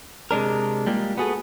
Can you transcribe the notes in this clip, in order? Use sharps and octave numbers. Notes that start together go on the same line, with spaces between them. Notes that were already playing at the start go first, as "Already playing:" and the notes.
C3 G#3 D4 A#4
G3 G#3 A#3 F4
B3 F#4 G#4 A4